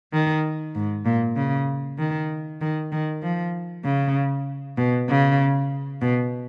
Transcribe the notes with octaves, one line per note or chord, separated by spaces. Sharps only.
D#3
G#2
A#2
C#3
D#3
D#3
D#3
F3
C#3
B2
C#3
B2